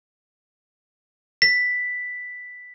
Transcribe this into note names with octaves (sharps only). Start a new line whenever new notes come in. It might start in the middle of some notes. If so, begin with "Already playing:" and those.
B6